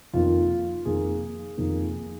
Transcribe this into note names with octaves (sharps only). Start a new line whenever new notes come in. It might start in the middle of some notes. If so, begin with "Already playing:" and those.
F2 D#3 A#3 F4
F2 D#3 A#3 G#4
F2 D#3 A#3